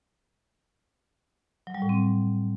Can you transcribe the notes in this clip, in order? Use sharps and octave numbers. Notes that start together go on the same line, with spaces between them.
F#3
G3
A2
C4